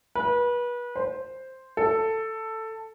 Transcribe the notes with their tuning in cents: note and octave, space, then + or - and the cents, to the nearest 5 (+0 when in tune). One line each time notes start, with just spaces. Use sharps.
B4 -30
C5 +0
A4 +10